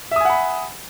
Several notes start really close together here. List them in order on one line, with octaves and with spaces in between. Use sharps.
E5 D#6 G#5 F#5 B5